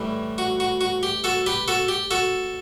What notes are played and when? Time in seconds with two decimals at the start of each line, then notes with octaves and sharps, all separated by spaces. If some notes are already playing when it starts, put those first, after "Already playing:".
Already playing: A2 E3 G3
0.38 F#4
0.60 F#4
0.81 F#4
1.03 G4
1.24 F#4 A4
1.46 G4 B4
1.68 F#4 A4
1.88 G4
2.11 F#4 A4